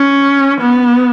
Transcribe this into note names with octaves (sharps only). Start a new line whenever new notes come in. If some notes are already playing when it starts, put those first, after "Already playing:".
Already playing: C#4
B3